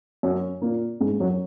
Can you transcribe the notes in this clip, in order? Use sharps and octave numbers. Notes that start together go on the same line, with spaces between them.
F#2 F#3
A#2 A#3
G#2 G#3
F#2 F#3